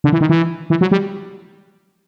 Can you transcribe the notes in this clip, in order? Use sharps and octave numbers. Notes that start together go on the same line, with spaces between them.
D3
E3
D#3
E3
E3
F#3
G3